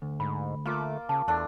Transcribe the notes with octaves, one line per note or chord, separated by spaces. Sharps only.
D2
G#2 B5
A3 A#3 F4 D6
C#3 A5
E2 A3 D4